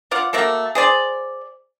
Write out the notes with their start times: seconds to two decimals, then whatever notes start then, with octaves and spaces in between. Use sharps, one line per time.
0.11 F4 D5 F5 F#5
0.33 A3 A#3 F#4 A4
0.75 G#4 C5 D5